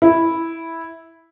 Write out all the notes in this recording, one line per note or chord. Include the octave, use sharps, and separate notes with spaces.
E4